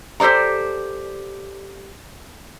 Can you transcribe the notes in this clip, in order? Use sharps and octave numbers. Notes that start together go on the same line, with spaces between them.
G4 A4 C5 D5 A#5